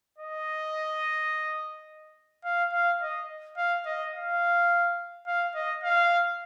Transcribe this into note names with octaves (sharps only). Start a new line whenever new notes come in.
D#5
F5
F5
D#5
F5
D#5
F5
F5
D#5
F5